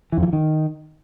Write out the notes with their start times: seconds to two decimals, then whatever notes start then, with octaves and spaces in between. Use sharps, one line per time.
0.12 E3
0.18 F2
0.23 E3
0.28 F3
0.33 D#3